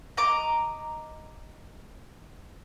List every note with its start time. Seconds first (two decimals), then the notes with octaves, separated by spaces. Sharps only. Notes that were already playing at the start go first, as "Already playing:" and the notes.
0.17 D#5 A#5 D6